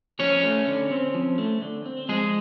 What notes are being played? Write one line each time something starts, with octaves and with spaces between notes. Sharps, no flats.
F3 C#4 C#5
A3
D3
C4
F3
A3
D3
C4
F3 G#3 G#4